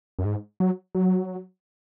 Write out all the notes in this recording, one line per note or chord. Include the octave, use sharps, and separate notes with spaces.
F#2
G#2
F#3
F#3